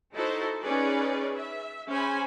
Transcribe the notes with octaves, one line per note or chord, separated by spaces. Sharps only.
D#4 E4 F#4 A4 C5 A5
C#4 D#4 G#4 B4 D5
E5
C#4 G#4 C5 G#5 B5